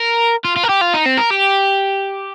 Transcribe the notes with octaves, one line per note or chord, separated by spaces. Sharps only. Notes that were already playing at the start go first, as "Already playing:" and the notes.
Already playing: A#4
F4
F4
A#4
G4
F4
D#4
C4
A#4
G4